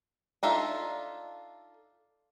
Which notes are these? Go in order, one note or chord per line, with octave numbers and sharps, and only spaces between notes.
D4 D#4 F4 A4 E5